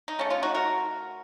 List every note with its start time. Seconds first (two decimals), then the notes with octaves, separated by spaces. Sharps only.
0.08 D#4
0.19 C#3 A3 C#4
0.30 C#4 F4
0.43 D#4 F#4
0.54 F#4 A#4